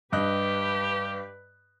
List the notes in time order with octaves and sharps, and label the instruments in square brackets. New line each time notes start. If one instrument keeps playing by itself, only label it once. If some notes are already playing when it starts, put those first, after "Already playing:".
[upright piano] G2 D#5 F#6 [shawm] G4 [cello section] B4